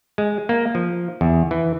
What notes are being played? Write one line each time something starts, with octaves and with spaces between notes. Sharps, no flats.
G#3
A#3
F3
E2
E3